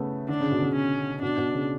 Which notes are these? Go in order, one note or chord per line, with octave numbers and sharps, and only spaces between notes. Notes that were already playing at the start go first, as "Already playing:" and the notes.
Already playing: C#3 A3 B3
D3 D4
C#3
B2
C#3
C#4
B2 D4
B2
C#3